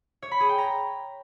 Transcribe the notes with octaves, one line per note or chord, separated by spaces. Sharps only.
C#5
B5
G#4
G5
A#5